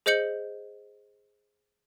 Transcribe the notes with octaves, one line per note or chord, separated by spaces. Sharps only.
G#4 C5 D#5 G6 C#7 F#7